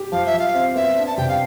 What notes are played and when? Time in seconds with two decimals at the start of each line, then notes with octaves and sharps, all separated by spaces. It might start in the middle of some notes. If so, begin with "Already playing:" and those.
Already playing: G4
0.12 F3 F5
0.26 E5
0.33 F3
0.39 F5
0.55 C4
0.76 B3 E5
0.97 D4
1.06 A5
1.18 C3 G5
1.29 F5